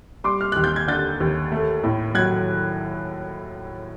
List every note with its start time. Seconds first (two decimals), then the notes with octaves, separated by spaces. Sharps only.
0.24 G3 C6 D6
0.41 F6
0.52 D#2 F#6
0.64 G6
0.76 G#6
0.87 D3 G6 A6
1.20 D#2
1.52 A3
1.84 A2
2.15 F#3 F#6 G#6